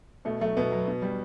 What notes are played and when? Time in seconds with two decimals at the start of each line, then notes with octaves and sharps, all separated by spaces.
0.25 B2 A3
0.41 F#3 A3
0.57 B2 B3
0.72 F#3
0.88 B2
1.02 G3